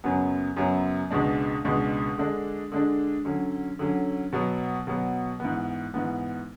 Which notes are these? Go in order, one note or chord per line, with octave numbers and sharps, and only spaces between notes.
F#2 C#3 F#3 B3
F#2 C#3 F#3 B3
C#2 B2 G#3 D4
C#2 B2 G#3 D4
D3 G#3 D4
D3 G#3 D4
D3 F#3 C#4
D3 F#3 C#4
B2 F#3 B3
B2 F#3 B3
G#2 E3 B3
G#2 E3 B3